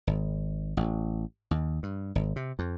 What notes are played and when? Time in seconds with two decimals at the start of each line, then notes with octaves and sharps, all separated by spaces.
0.07 G#1
0.77 A1
1.51 D#2
1.83 G2
2.15 G#1
2.36 C3
2.59 F2